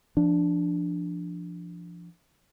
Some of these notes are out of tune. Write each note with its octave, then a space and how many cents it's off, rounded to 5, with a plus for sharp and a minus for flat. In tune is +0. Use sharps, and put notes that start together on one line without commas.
F3 -20 D4 +0